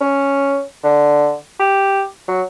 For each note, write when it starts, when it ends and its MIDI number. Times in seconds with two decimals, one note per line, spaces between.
0.01 0.60 61
0.84 1.34 50
1.59 2.03 67
2.28 2.42 54